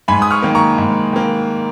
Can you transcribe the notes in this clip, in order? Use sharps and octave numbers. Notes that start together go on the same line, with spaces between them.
G#2 G#5 B5
D#6
C#6 F6
D#3 A#3
A#5 C#6
G#2
D#3 A#3